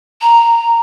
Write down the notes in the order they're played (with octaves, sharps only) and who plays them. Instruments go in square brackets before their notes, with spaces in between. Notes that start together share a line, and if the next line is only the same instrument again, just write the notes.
[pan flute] A#5